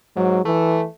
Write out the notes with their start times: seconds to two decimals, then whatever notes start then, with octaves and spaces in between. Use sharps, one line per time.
0.16 G#2 F#3
0.45 E3 A3